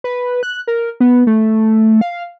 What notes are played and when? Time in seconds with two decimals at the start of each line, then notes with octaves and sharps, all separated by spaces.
0.04 B4
0.43 F#6
0.68 A#4
1.00 B3
1.27 A3
2.01 F5